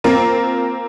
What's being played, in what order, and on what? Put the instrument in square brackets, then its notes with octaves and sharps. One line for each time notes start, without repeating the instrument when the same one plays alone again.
[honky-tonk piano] A#3 C4 F4 A#4